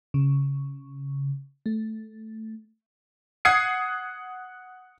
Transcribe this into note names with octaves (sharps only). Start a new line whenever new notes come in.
C#3
A3
F#5 D#6 G#6 C7 C#7